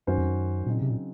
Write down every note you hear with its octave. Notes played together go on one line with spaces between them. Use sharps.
F#2 D#3 F#3 C#4 F#4 C5
F2
F#2
A#2 C#3 F#3 C4 D#4
C3
A#2